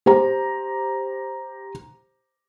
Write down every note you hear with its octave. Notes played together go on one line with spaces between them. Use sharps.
G4 C5 A#5